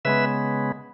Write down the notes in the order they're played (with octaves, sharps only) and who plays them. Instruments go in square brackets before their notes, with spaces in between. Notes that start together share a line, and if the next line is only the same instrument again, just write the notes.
[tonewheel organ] C#3 G#3 B3 B4 E5